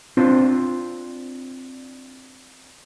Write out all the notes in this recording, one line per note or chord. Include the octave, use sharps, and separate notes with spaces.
C4 D4 F4 C5